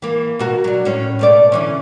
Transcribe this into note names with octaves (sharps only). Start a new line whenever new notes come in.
E3 A#3
B2 F#4 A#4
F#3 D4
A2 C#4
B2 A3 D5
D3 E3 C#4